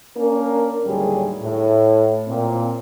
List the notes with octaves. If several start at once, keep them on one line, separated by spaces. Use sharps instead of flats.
A#3 C#4 D4 A#4
D#2 A2 D3 F#3 G3 G#4
A2
A#2 C4